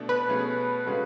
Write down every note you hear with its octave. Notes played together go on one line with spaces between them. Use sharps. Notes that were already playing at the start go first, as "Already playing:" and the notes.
Already playing: B2 A3 D4
B4
B2 A3 C#4 G#4
C#3 G#3 C#4 F#4 A4